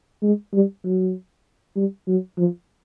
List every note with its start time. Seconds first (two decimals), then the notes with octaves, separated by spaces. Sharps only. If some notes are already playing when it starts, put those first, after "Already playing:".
0.23 G#3
0.53 G3
0.84 F#3
1.76 G3
2.07 F#3
2.38 F3